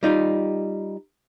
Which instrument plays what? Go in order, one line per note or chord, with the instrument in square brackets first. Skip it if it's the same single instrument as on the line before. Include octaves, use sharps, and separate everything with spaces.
[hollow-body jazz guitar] G3 D#4 F4